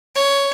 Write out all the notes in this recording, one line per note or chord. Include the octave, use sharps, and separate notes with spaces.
C#5